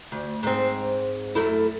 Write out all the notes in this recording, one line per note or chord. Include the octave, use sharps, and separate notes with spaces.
D2
G#2 C4
F#2 A3 E4